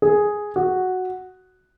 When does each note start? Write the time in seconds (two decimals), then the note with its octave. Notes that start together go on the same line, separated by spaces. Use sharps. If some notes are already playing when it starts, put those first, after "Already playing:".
0.02 G#4
0.56 F#4